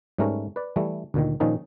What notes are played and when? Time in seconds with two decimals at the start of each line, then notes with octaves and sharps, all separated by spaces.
0.18 G#2 G3 A3 C#4 A#4
0.56 B4 D5
0.76 E3 G3 A3
1.14 D2 A#2 D#3
1.40 A#2 D#3 F3 C#4 D#4